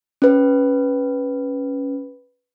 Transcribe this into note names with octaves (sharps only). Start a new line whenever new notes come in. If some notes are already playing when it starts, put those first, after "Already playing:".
C#4 B4